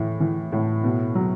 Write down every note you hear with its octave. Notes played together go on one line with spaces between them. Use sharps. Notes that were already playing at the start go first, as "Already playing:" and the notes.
Already playing: A2 E3
E3
A2
B2
F#3